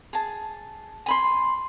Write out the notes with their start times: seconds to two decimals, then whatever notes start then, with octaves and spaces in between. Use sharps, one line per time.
0.13 G#4 A5
1.06 G#5 B5 C6